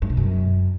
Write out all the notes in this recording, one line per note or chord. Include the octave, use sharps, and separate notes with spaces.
G2
B2
F#2